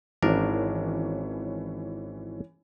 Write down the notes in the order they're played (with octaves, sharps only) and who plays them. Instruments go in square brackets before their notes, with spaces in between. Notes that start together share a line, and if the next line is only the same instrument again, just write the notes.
[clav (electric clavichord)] G#1 D4 A#4 [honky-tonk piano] E3 C#4